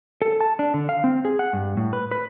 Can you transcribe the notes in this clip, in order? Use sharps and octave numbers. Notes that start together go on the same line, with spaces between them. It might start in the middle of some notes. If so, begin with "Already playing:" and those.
A4
A5
D4
D3
F5
C4
G#4
F#5
G2
A2
B4
B4